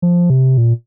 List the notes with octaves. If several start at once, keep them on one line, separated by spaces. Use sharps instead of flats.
F3
C3
A#2